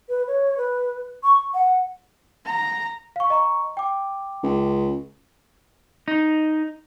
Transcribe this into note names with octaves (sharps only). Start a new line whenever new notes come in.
B4
C#5
B4
C#6
F#5
A#5
F5 C#6
D#5 A#5 C#6
G5 D6
C#2
D#4